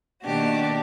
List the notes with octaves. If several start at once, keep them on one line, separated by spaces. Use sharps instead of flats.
B2 D#3 A#3 D4 F#4 G4